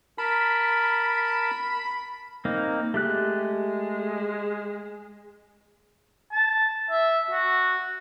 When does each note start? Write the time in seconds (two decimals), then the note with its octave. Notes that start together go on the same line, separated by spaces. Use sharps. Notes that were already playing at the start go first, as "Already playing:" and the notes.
0.18 A#4 A5 B5
2.45 A#3 C4 D#4
2.94 G#3 A3 G4 F#6
6.32 A5
6.91 E5
7.31 F#4